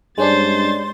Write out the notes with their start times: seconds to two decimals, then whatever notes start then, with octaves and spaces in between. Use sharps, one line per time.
0.18 G2 G#3 C#4 D4 C5 C6 A6